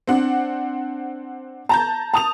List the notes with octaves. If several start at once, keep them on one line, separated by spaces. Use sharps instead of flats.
C4 D4 F#5
A5 A#5 G6
A5 D#6 F7